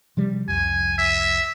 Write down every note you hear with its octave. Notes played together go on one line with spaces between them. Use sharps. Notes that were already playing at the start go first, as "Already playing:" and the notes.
C3 F3 G3
C2 F2 G#5
E5